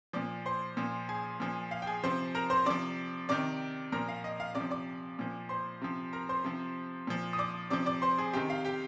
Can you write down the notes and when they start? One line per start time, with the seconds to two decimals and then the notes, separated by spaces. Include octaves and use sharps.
0.13 A#2 F3 D5 D6
0.46 C5 C6
0.77 A#2 F3
1.09 G#4 G#5
1.40 A#2 F3
1.71 F5
1.82 G5
1.87 G#4 G#5
2.03 C3 F3 C5 C6
2.35 A#4 A#5
2.50 C5 C6
2.66 C3 F3 D5 D6
3.29 C3 D#3 D5 D6
3.92 A#2 F3 A#4 A#5
4.09 F5
4.24 D#5
4.40 F5
4.55 C3 D5 D6
4.60 F3
4.71 D5 D6
5.19 A#2 F3
5.49 C5 C6
5.82 C3 F3
6.13 A#4 A#5
6.29 C5 C6
6.44 C3 F3
7.07 A#2 F3
7.33 D#6
7.38 D5 D6
7.70 C3 F3 D5 D6
7.86 D5 D6
8.02 C5 C6
8.19 G#4 G#5
8.33 C3 D#3 G4 G5
8.50 F5
8.65 G4 G5